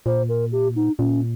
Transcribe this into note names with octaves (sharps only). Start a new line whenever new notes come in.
A#2 C5
A#4
G4
D#4
A#2 C#4